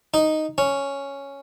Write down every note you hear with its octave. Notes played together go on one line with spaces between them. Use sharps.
D#4
C#4